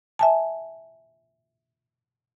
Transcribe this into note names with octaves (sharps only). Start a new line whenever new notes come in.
E5 G#5 A5